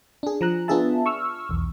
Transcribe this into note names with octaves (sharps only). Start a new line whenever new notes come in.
D4 G#4
F3 A#5 F#6
B3 D4 F4 G#4 E5 A5
C#6 E6 F6
B1 E2